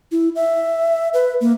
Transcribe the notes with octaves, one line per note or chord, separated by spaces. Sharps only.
E4
E5
B4
A#3